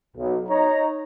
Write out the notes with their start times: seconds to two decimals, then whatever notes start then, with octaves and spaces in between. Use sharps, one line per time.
0.17 B1
0.48 D#4 C#5 A#5